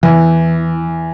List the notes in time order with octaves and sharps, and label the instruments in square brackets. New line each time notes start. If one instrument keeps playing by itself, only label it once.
[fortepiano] E2 [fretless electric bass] E3